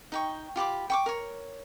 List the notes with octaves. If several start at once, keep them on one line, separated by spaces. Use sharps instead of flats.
D#4 G5 C#6
F4 G4 B5 D6
G5 C#6 D6
A#4 C#5